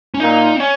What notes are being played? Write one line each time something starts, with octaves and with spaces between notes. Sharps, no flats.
C#4
A#2 D#4
C4
C#4